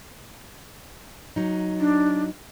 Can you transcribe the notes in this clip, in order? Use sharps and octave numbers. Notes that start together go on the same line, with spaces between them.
F#3 D#4
D4